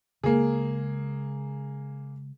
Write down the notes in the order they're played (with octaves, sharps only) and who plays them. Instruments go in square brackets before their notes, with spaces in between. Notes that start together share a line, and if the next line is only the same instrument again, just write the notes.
[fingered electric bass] C#3 G#3 [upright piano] A#3 G#4